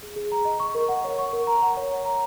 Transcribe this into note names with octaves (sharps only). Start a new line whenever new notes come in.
G#4
G#4
A#5
D#5
C#6
A#4
F#5
C#5
C#6
A#4
A#5
F#5
C#5
C#5
A#5